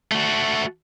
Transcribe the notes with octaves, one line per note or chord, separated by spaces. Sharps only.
A3 F#4